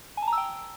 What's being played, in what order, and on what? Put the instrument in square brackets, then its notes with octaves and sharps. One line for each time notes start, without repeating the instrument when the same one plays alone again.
[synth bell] G#5
A5
A#5
E6
G5